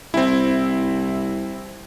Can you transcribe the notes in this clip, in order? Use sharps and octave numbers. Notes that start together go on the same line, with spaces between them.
C2 C4 E4